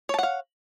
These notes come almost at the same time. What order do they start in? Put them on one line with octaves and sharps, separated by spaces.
C#5 A5 F#5 F5